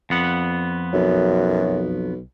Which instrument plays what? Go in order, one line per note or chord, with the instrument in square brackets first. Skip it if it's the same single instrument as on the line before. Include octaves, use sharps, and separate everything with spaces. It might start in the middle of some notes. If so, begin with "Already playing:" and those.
[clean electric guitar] F2 B3 F#5
[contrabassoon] B1 [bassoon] F#2